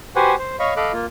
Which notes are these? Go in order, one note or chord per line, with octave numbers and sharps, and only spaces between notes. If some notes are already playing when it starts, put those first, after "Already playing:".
F#4 G4 B4 C5 F#5 G#5
C5
C#5 D#5 F5 B5 C#6
A4 D#5 F5 B5 D6 F#6
A#3 F4